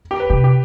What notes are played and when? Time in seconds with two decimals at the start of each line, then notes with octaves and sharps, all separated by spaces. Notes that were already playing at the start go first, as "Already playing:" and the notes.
0.11 G4
0.20 B4
0.30 C3 G4
0.44 G4